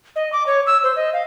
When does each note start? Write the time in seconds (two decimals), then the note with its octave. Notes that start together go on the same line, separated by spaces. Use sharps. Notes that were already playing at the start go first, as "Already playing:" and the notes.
0.16 D#5
0.33 D6
0.46 C#5
0.67 E6
0.83 C5
0.96 D#5
1.13 F5